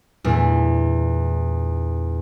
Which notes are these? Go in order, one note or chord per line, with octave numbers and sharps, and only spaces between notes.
E2 A#2 A3 D4